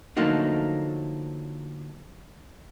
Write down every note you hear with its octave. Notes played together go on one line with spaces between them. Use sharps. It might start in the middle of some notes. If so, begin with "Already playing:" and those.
D3 F3 F#3 A3 A#3 D#4